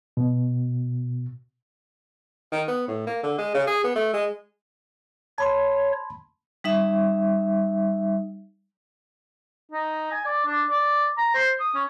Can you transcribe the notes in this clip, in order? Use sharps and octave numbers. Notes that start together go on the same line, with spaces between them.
B2
D#3
B3
A2
A#3
D3
G#3
C#3
G#4
B3
A3
G#3
C#5 A5 B5 C6
G3 D#4 E5
D#4
G#5
D5
D4
D5
A#5
C5
D#6
C#4